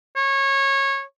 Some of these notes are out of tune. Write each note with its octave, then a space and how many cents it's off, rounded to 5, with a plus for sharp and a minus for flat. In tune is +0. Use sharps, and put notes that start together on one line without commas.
C#5 -20